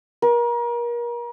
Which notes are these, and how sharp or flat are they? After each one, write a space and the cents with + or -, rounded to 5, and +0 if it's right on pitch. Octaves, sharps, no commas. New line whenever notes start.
A#4 +35